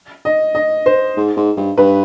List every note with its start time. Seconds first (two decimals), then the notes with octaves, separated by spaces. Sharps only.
0.25 D#5
0.55 D#5
0.86 C5
1.17 G#2
1.37 G#2
1.57 G2
1.77 G2 B4